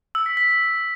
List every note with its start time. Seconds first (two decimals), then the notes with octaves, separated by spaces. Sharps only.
0.15 E6
0.26 B6
0.37 B6